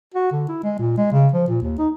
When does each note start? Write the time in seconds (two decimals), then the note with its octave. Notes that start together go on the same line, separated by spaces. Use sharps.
0.14 F#4
0.32 D3
0.48 E4
0.63 G#3
0.79 A#2
0.97 G#3
1.12 C#3
1.33 F3
1.48 A#2
1.62 D#2
1.78 D#4